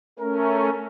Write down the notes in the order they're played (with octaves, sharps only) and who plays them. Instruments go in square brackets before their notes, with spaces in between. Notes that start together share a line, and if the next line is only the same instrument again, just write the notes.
[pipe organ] A3 C#4 [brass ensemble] A#4